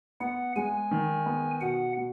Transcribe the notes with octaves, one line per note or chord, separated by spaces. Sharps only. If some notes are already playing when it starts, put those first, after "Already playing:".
B3 F#5
G#3 G#5
D#3
B3
B2 F#5
B2